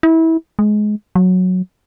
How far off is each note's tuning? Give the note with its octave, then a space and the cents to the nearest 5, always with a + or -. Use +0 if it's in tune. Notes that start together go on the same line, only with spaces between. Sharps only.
E4 -25
G#3 +20
F#3 -10